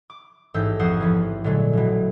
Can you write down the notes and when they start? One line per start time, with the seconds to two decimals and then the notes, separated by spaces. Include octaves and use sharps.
0.10 D6
0.54 A1 G#2 E6 G6
0.79 F2 F3 C5 F#5 D#6
1.01 E3 F3 B3
1.44 A#2 D3 F#3 G#3 A3
1.73 A1 B2